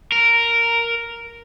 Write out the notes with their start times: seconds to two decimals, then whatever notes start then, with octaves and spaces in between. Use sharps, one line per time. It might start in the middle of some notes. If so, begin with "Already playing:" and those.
0.12 A#4